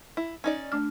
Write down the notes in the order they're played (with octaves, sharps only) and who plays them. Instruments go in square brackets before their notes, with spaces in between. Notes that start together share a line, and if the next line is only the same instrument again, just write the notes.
[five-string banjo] E4
C#4 D#4 D5
[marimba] A3 D4 F6